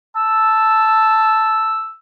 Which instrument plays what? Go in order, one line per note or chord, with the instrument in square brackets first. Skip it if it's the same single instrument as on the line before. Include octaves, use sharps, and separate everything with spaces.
[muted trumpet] A5 [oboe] E6